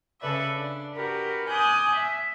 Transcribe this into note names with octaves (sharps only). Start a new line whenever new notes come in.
C#3 A4 B4 D5 E5
D4
F#4 G4 A#4 B4
G#5 D6 D#6 F#6 G6
E5